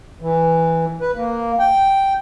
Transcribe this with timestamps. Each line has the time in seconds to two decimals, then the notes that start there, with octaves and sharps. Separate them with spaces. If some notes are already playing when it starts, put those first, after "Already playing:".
0.21 E3
1.01 B4
1.15 A#3
1.59 G5